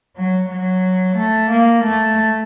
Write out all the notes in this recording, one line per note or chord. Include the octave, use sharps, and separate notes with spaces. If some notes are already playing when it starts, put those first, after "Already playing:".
F#3
F#3
A3
A#3
A3